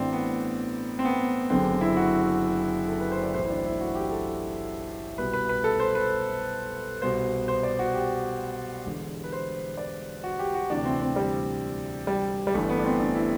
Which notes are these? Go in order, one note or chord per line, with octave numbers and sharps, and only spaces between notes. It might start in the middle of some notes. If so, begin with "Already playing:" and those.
Already playing: A1 A2 E3 C4 D4
B3
C4
B3
F#1 F#2 D3 C4
E4
F#4
A4
B4
C5
D5
B1 A2 E3 C5
E4
D4
E4
F#4
G4
A4
C2 B2 B4
B4
B4
A4
C5
B4
C2 B2 C5
C5
D5
F#4
G4
E1 E2 D3
B4
C5
D5
F#4
G4
F#4
D2 C3 E3 D4
C4
C4
G3
G3
G3
G1 G2 E3 A3
B3
D4
C4
D4
E4